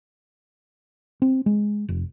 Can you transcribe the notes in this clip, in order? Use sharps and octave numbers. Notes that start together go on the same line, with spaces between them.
C4
G#3
F1